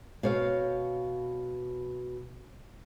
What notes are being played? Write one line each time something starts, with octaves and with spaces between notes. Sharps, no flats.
B2 C#5 F5